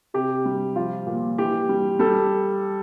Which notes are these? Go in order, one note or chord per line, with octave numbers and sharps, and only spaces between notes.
C3 G4
G3
F3 F4
A#2
E3 G4
G3
G3 A4